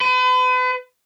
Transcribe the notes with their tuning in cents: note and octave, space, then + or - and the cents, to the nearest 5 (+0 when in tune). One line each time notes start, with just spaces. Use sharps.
B4 +40